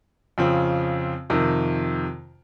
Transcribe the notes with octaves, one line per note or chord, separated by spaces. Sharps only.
F2 C#3 F3 C4
F2 C3 D#3